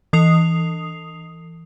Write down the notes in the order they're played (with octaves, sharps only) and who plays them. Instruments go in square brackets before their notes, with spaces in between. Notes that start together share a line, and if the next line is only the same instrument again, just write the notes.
[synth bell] E3 D#6 C7 F7